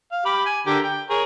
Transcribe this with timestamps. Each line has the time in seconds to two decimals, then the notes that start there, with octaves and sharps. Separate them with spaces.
0.12 F5
0.25 G4 B5 D6
0.46 G#5
0.66 D3 G4 A#4
0.83 G5
1.10 G#4 A#4 C#5